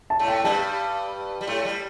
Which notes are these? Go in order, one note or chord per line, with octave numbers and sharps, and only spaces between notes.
A5
A2 A3
G5
G2 G3 A5
G3
A2 A3
G3